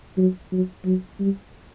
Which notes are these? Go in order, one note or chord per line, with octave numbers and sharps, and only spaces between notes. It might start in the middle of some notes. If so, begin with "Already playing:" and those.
F#3
F#3
F#3
G3